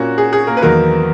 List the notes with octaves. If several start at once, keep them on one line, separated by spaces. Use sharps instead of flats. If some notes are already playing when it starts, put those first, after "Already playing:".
Already playing: A#2 A#3 C#4 F#4
G#4
G#4
A#3 A#4
B4
E2 D#3 F#3 A#3 B3 A#4